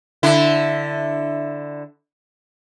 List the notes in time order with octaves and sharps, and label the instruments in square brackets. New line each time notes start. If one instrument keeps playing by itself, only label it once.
[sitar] D3 E4